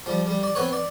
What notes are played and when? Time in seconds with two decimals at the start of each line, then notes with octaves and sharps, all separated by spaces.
0.06 F3 G3
0.27 G3
0.43 D5
0.55 B3 C4 B4 C#5
0.73 D5